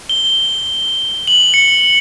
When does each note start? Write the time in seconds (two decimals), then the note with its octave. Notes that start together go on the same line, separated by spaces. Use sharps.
0.09 G7
1.27 F#7
1.54 C#7